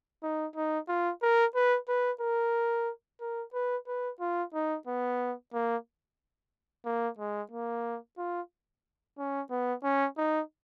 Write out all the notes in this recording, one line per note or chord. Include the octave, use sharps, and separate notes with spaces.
D#4
D#4
F4
A#4
B4
B4
A#4
A#4
B4
B4
F4
D#4
B3
A#3
A#3
G#3
A#3
F4
C#4
B3
C#4
D#4